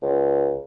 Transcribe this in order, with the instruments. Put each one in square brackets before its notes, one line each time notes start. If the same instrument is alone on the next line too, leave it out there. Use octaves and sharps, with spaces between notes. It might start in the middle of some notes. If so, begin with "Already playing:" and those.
[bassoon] C#2